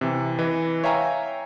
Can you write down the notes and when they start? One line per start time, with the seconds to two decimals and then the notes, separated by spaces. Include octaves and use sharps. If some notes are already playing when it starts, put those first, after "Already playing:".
0.01 C3 E3
0.39 E3 B4 D#5
0.84 C#5 E5 F5 G5 G#5 A#5